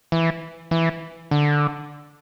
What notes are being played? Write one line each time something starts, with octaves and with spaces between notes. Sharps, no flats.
E3
E3
D3